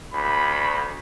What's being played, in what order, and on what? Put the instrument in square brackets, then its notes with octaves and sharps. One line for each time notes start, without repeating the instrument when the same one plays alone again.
[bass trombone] D2 [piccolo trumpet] B5